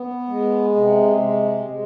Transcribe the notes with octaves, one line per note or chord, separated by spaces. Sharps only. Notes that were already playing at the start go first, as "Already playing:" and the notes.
Already playing: B3
G#3
C3
G#3
G#3